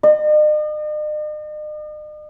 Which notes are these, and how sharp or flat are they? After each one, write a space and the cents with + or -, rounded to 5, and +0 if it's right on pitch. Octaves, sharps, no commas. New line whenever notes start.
D#5 -45